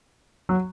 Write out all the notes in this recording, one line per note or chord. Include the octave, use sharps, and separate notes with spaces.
F#3